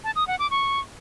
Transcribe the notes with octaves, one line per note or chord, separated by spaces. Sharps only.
A5
D#6
F#5
D6
C#6